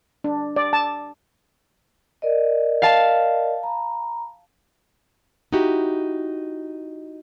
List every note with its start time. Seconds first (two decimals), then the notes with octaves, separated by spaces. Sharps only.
0.24 D4
0.56 D5
0.73 A5
2.22 A#4 D5 D#5
2.82 F5 A5
3.63 A#5 B5
5.52 D#4 E4 F#4 G4